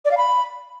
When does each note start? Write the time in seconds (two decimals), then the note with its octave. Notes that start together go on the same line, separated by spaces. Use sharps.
0.05 D5
0.11 F5
0.17 B5